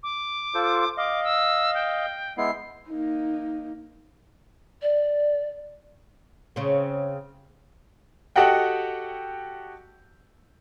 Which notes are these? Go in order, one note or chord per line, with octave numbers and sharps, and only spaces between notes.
D6
F4 A4 C5
D#5 F5 D6
E6
G5
G#3 B3 E4 C7
A#3 D#4
D5
C#3 C4
F#4 G4 A4 D#5 F#5 G5